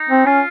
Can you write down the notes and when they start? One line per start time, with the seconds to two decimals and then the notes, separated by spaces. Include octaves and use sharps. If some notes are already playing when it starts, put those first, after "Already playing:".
Already playing: D#4
0.10 C4
0.26 C#4 F4